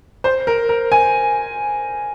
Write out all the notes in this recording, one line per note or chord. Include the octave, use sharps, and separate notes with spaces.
C5
A#4
A#4
G#5